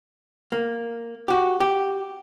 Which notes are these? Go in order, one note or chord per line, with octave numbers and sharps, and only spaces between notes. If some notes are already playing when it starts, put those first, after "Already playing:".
A#3
F#4 G4
G4